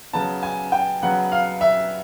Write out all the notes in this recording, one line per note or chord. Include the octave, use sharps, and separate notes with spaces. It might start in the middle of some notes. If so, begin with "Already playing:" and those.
C#3 F#3 B3 A5
G#5
G5
C#3 F#3 B3 F#5
F5
E5